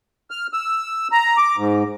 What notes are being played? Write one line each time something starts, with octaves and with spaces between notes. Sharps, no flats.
F6
E6
A#5
D6
G#2